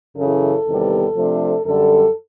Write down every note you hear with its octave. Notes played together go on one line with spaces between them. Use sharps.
F#2 C#3 E3 A4
E2 C3 D#3 G3 B3
C3 F3 A3 D4
F#2 D3 G3 A4